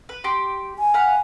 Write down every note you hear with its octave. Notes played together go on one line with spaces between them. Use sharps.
B4
G4 C6
G#5
F5 F#5 B5